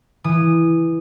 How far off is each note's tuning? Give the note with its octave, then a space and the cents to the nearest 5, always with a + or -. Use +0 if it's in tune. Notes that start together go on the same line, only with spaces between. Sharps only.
E3 +0 D#6 -15